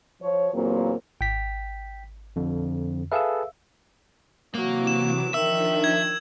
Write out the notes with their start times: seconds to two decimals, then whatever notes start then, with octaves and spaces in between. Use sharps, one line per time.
0.22 F3 C#5
0.54 E2 A#2 F#3 A#3 C4
1.21 G#1 G5 B6
2.36 F2 D3
3.11 G#4 A4 B4 E5 F5 E6
4.55 C3 E3 F#3 A#3 D6
4.87 E7
5.34 D#3 F3 D4 D#4 E5 E6
5.84 G#6